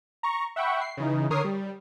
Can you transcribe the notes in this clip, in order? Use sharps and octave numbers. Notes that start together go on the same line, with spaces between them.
A#5 C#6
E5 F#5 G5 B5 C#6
C7
C#3 E3 D#4
D3 A#4 C#5 D#6 C7
G3